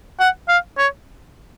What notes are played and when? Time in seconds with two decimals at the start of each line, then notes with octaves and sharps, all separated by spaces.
0.20 F#5
0.49 F5
0.78 C#5